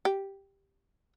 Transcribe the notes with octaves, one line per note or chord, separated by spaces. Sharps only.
G4